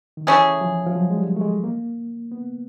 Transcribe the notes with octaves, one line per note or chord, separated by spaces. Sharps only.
D#3
E3 A3 C#4 E4 G#4
F3
F3
F#3
G#3
G3
A3
G#3
A#3
B3